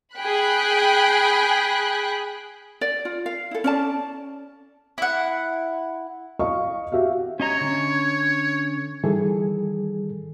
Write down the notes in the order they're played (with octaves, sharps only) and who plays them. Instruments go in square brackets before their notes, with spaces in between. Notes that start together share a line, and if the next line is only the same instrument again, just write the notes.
[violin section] G#4 G5 B5 F#6
[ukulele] D5
F4
F5
E4 A4
C#4 D5 A5
[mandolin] E4 F#5
[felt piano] D#5 F5 C#6
F#4 G4 E5 F5
[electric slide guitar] C#4 D#5 A#5 [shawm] C#5
[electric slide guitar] D3 C#4
[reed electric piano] D#3 E3 G3 G#4 A4